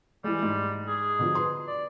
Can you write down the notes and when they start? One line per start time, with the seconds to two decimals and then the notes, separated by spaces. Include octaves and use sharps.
0.24 E3 G3 G#3
0.43 G#2
0.87 G#4
1.19 B2 D3 F3
1.35 B4 C6
1.67 D5